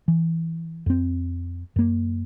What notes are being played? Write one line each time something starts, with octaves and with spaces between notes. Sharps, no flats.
E3
F2 C4
F#2 A#3